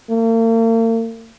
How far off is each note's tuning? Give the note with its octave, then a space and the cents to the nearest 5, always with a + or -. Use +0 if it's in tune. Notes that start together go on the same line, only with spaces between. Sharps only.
A#3 -45